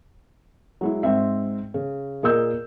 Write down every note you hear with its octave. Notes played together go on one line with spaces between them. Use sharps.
F#3 G#3 E4
G#2 C4 E5
C#3
A#2 G#4 A#4 D#5 E6 G6